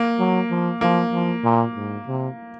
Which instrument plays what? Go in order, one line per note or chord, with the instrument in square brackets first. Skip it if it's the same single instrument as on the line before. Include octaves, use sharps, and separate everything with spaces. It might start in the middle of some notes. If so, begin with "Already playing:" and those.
Already playing: [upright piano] A#3
[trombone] F#3
F3
[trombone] F3 [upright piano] A#3
[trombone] F3
A#2
G#2
C3